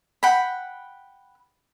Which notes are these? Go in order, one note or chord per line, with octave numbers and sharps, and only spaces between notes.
F#5 G5 B5